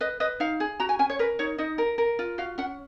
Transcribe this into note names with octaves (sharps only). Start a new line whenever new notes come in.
B4 D#5
B4 D#5
D#4 F5
G#4
F#4 A#5
G#5
C#4 G#5
C#5
A#4 B4
D#4 C#5
D#4 D#5
A#4
A#4
F4
F#4 F5
C#4 F#5